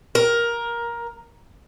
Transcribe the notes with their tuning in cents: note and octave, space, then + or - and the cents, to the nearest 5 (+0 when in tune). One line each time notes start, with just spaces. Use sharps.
A#4 +15